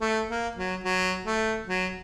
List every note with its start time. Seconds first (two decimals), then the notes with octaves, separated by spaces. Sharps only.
0.01 A3
0.29 A#3
0.56 F#3
0.84 F#3
1.26 A3
1.67 F#3